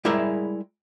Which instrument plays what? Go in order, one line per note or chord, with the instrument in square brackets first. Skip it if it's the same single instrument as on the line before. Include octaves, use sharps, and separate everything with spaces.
[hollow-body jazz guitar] G3 G#3 E4 G#4 A#4 E5